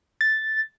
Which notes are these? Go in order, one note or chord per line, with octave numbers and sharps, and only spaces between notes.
A6